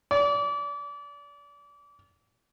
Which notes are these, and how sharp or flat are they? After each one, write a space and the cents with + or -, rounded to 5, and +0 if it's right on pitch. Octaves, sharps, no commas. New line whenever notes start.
D5 -30